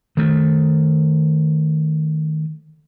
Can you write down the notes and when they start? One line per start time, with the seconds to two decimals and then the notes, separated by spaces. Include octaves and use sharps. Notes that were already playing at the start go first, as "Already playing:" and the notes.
0.17 D#3 A3